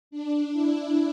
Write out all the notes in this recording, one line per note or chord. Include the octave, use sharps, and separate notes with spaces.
D4
E4